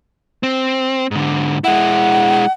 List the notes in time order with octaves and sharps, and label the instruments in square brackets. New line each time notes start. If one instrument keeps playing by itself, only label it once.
[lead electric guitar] C4
G#2 D3
[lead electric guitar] G#3 E4 [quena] F#5